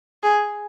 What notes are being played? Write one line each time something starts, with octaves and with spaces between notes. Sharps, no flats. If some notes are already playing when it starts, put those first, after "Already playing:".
G#4